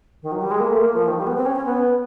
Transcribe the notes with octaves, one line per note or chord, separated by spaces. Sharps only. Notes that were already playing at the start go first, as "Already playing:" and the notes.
D#3
F#3
G3
G#3
A#3
A3
A#3
F3
D#3
G3
B3
C4
C#4
C#4
B3